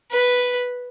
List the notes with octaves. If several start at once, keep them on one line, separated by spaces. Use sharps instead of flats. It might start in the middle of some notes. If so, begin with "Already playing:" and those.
B4